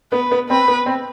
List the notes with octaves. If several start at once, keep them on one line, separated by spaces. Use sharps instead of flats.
B3 B4
B3
C4 B4
B3
C4